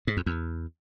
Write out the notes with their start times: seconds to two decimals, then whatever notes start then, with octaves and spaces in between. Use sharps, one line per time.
0.07 G#2
0.17 F2
0.26 E2